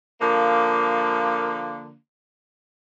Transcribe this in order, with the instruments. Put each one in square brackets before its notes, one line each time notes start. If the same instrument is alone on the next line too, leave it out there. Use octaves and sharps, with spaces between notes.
[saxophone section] D3 F3 A#3